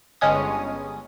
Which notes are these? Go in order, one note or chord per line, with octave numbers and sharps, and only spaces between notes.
G1 G#3 C#4 D#6